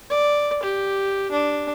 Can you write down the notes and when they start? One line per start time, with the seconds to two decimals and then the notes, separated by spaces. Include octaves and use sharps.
0.11 D5
0.63 G4
1.32 D4